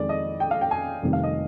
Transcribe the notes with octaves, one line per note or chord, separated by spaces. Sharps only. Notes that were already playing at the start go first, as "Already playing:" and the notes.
Already playing: F2 D#3 G#3 D5
D#5
G5
F5
G5
G#5
F1 F2 C3 D#3 G3
F5
D#5